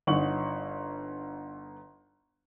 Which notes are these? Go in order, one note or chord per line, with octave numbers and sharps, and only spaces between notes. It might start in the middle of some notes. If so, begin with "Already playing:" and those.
G1 D#4 C#5 F#5 C#6 F#7